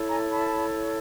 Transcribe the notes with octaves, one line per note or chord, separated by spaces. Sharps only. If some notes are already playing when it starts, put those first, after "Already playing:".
Already playing: E4 A4 C#5
G#5 A#5
A5 B5